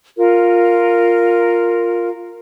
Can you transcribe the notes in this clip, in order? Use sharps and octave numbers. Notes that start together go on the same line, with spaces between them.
F4 A#4